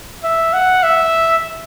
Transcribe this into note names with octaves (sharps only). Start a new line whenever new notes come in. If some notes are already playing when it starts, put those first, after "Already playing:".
E5
F#5
E5